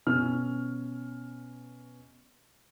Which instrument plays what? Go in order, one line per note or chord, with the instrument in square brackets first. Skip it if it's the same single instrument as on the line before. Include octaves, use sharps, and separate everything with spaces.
[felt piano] B2 C#4 F6